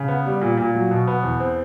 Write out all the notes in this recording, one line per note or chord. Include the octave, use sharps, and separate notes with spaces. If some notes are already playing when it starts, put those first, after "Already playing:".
Already playing: C#3
B3
G3
A#2
A#2
F#3
B2
B3
E2
C4